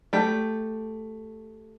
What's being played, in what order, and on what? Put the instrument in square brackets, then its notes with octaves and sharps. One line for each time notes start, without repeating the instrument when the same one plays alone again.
[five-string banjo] A3 G4